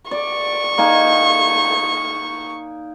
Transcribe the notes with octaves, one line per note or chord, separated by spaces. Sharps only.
D5 C#6
A#3 D#4 G#5